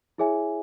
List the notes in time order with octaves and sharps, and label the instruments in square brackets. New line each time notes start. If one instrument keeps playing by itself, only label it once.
[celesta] E4 G#4 C#5 E5 G#5